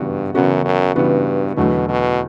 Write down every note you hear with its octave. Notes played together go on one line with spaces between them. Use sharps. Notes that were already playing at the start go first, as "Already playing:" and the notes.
Already playing: G2 C#3 E3 B3 F#4
F#2 C#3 E3 B3 F#4
F#2
G2 C#3 E3 B3 F#4
E2 B2 D3 F#3 A3
B2